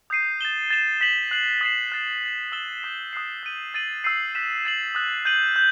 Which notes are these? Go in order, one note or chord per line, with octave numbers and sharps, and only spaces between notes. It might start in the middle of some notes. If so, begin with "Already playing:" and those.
D#6 G6 C7 D#7
A6 E7 G7
A6 E7 G7
G6 B6 F#7
F#6 C7 F#7
D#6 A6 C7 E7
F#6 A6 C7
A6 C7 F#7
E6 A6 E7 G7
D#6 G6 B6
D#6 F#6 C7
G6 D#7 F#7
E6 A6 D#7 F#7
E6 G6 C7 D#7
F#6 B6 E7
A6 C7 F#7
D#6 F#6 A6
G6 D#7 F#7
G6